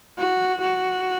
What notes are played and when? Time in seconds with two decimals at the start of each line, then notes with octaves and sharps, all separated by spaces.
0.18 F#4
0.61 F#4